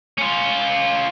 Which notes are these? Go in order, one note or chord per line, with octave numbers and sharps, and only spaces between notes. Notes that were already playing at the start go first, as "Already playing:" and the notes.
C#4 F4